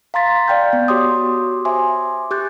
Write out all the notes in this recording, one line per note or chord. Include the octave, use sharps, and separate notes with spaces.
F5 A#5 C6 A6 B6
D5 F5 G5 F6 G6
B3
F#4 G4 C#5 C6 D6 D#6
C5 E5 G#5 C6 D6
G4 D6 F#6 G6 A6